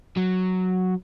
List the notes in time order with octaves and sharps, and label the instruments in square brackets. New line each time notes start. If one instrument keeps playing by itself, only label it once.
[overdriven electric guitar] F#3